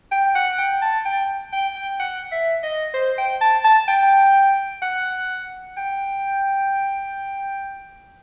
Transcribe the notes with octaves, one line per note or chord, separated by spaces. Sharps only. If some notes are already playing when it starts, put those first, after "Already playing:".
G5
F#5
G5
A5
G5
G5
G5
F#5
E5
D#5
C5
G5
A5
A5
G5
F#5
G5